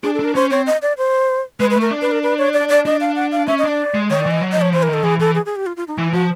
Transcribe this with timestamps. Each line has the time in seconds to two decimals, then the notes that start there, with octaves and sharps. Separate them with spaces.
0.03 D4 G#4
0.14 A4
0.19 D4
0.24 A#4
0.35 C#4 C5
0.51 C4 C#5
0.67 D#5
0.82 D5
0.98 C5
1.60 G#3 B4
1.70 B4
1.76 A3
1.81 A#4
1.91 D4
2.02 B4
2.12 A#4
2.23 B4
2.38 C#5
2.53 D5
2.69 D5
2.85 D4 D#5
3.01 F5
3.16 F#5
3.32 F5
3.47 C#4 E5
3.59 D#5
3.63 D4 D5
3.94 G#3
4.10 D#3 C#5
4.20 D5
4.26 E3 D#5
4.41 F#3
4.52 D#5
4.56 F3
4.62 C#5
4.73 E3 C5
4.83 A#4
4.88 D#3
4.93 A4
5.04 E3 G#4
5.19 E3 A4
5.35 G#4
5.46 G#4
5.56 G4
5.66 F4
5.77 F4
5.88 D#4
5.97 E3 E4
6.13 F3 F#4